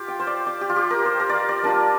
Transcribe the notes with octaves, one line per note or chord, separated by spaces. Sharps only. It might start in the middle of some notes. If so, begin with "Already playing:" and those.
Already playing: F4 G4 F5
G5
C5
D5
D5
G4
F4
G4
A#4
C5
A#4
D5 F5
D5
G3 D4 F4 A#4